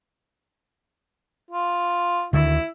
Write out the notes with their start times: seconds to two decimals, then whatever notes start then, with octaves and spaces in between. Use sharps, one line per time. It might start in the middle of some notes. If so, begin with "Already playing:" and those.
1.50 F4
2.33 D2 D3 D#3 E4